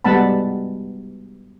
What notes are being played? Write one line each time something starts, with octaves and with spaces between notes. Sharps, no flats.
G3 G#3 B3 F#5 A5 B5